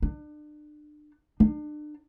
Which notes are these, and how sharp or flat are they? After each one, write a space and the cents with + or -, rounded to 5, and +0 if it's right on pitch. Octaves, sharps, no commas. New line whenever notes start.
D4 +35
D4 +35